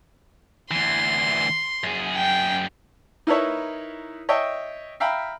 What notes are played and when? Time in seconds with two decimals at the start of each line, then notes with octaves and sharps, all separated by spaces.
0.71 D2 E3 C6
1.84 F#2 G#4
2.16 G5
3.27 D#4 E4 A#4 B4 C#5 E5
4.29 C#5 D#5 E5 G5
5.00 E5 F5 G5 A#5 B5